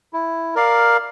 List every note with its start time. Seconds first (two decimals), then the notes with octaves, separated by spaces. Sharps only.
0.13 E4
0.55 A#4 D5 F5